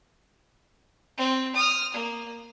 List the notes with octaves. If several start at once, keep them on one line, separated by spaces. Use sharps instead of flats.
C4
D#6 F6
A#3